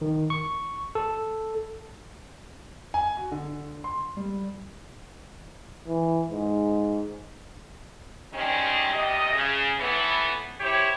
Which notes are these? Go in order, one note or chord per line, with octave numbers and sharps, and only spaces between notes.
D#3
C#6
A4
G#5
F#4
D3
C6
G3
E3
G#2
C3 D#3 G3 G#3 C4 C#4
D2 C3 G4 D#5
C#3
A2 E3 A3 B3
E4 G4 C5 C#5